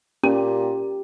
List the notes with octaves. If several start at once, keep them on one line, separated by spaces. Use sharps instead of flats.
A#2 C#4 G4